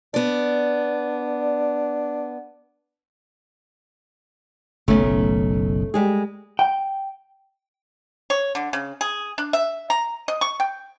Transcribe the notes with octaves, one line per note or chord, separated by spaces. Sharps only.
B3 D4 D5
F#1 B1 A3 C#4 D#4
G3 G#3 G#4
G5
C#5
D3
C#3
G#4
D4
E5
A#5
D#5
C#6
G5